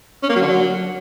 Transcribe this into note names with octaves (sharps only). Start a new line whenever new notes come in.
C#4
A#3
F#3
D3
F#3